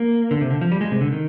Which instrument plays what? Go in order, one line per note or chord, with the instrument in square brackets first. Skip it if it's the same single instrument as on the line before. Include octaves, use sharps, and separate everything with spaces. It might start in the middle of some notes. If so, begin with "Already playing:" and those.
Already playing: [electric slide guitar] A#3
D3
C3
D3
F3
G3
G#3
C3
D3
D#3